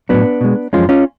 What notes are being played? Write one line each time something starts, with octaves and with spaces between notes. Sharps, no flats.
A2 F#3 B3 D4
B2 G#3
F#2 F3 G#3 C#4 F4
C#4 F4